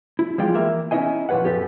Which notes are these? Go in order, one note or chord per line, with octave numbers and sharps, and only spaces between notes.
E4
F3 G3 G#3 F4 D5 G5
E3 A#3 A#4 E5
C#4 D#4 E4 D#5 G#5
A#2 F3 B4 C#5 F#5
F#2 G4 A4 B4